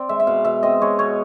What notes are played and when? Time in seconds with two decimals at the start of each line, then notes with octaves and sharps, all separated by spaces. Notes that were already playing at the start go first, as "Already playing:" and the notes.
Already playing: C4 D5
0.09 G#3 E5
0.20 E5
0.27 B2 F5
0.45 B2 E5
0.63 C4 D#5
0.82 G#3 C#5
0.99 B2 C#5